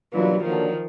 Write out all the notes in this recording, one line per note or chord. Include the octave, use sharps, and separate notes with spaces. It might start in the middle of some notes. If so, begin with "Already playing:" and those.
B2 E3 F#3 G3 A#3 D4 F4
D3 D#3 F3 F#3 A#3